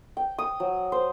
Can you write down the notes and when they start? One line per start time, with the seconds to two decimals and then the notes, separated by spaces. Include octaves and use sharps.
0.17 G5
0.38 D#6
0.60 F#3
0.92 C5